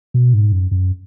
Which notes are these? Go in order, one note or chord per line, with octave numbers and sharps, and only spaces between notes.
B2
G#2
F#2
F#2